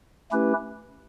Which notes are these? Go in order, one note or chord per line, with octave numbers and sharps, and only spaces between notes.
A3 C#4 E4 G4 B4